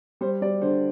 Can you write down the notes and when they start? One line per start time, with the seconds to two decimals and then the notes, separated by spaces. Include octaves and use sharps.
0.21 G3 C5
0.42 G3 D5
0.62 D3 C5